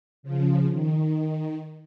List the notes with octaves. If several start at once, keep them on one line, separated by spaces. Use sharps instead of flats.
C#3 F3
D#3